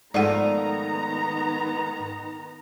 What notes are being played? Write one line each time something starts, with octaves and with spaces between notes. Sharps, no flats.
G#2 D#3 F3 A3 B3 D5 F#5 A#5